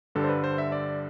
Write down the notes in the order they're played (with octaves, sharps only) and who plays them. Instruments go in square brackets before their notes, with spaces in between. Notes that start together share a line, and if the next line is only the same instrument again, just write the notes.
[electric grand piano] G2 D3 G3 A4
C5
B4
C5
E5
D5